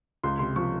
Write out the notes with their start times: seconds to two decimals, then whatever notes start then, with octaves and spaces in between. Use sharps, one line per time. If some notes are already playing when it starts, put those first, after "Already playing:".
0.24 C#2 C6
0.39 C3 C6
0.56 F3 C#6